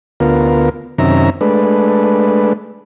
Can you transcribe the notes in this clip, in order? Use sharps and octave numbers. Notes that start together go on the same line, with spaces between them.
D2 B3 F4 A#4
F#2 C3 D#3 C#4 E5 A#5
G#3 A3 D4 B4